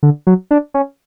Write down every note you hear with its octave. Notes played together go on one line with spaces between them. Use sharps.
D3
F#3
D4
C#4